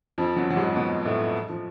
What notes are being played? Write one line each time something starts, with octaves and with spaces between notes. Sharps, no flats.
F2 F3
F#2 F#3
F#3
G#2 G#3
B2 B3
A2 A3
F3